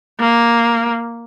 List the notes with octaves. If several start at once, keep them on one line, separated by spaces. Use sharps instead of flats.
A#3